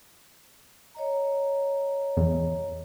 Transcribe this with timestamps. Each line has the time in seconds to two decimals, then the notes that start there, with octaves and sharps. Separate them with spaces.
0.95 C#5 D#5 A#5
2.17 E2